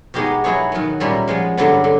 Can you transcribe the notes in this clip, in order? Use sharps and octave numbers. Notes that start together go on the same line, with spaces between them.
B2 G#3 B3 D#4 G4
F#3 B3 E4 G#4 C#5
D#3 F#3 B3
A#2 G3 A#3 C#4 E4
F3 G#3 B3
G2 D3 F#3 B3
D3